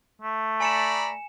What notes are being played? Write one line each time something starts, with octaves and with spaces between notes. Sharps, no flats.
A3
D5 G#5 A#5 B5 C#7 E7